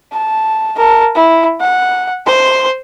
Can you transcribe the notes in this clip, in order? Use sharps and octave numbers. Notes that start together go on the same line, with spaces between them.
A5
A#4 A5
E4
F#5
C5 C6